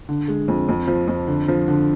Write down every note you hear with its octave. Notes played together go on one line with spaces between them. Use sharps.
D3
G#3
F2
F2
F3
F2
D3
F3
D3